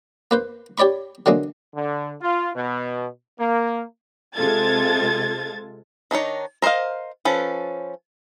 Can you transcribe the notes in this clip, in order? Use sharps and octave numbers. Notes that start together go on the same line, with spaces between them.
A#3 B4 C5
G4 C#5 D5 B5 C#6
D3 F#3 G#3 A#3
D3
F4
B2
A#3
C3 G#3 F4 A4 G#6 A6
D#3 D4 D#4 C#5
A#4 C5 D5 D#5 F5
F3 C#4 A4 B4